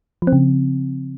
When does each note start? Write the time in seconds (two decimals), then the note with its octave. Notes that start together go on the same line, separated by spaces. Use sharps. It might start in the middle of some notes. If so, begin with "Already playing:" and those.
0.22 F3
0.27 C4
0.33 C#3